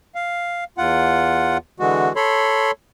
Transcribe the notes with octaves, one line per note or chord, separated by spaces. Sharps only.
F5
E2 F4 F#5
D3 E3 G#3 F#4
A4 C#5 B5 C6